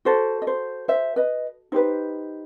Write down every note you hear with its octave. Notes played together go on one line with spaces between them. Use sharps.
F#4 A4 C5
D#5
C5
C5 E5
B4 D#5
D#4 G4 B4 C5